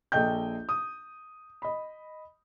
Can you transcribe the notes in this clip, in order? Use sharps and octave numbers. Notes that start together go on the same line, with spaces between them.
A#1 A4 D#5 G5 G6
D#6
D#5 B5